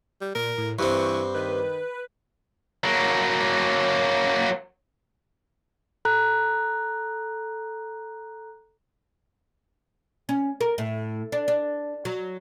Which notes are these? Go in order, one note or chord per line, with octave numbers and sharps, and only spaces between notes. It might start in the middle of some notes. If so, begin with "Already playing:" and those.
G3
A#2 A#4
A2
G2 E3 C4 C#6
D#3 B4
F#3 A#3
A4 A#5 F#6
C#4
A#4
A2
D4
D4
F#3